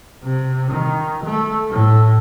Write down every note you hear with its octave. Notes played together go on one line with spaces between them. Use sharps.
C3
D#3
A3
A2